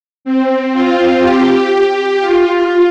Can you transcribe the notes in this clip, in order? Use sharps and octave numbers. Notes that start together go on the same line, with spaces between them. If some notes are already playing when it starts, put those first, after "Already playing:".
C4
F4
G4
F4